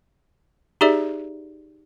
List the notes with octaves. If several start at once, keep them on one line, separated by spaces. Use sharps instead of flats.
D#4 G4 G#4 D5 E5